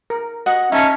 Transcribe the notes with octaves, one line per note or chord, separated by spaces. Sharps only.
A#4
F#4 D#5 F#5
C#4 D#4 E5 F5 A5 C#6